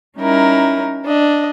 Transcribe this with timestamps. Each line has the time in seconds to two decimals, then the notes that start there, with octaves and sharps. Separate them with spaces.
0.18 G3 C#4 D#4 E4 A#4
1.05 D4 D#5